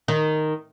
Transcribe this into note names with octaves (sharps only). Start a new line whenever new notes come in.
D#3